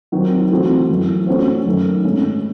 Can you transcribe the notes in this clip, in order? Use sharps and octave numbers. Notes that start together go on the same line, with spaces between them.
D#3 F#3 C4 F#4
E3 A3 C4 F#4
F#2 E3 A3
A3 C#4 F#4 C5
F#2 D#3 A3
G#2 D#3 A3 C#4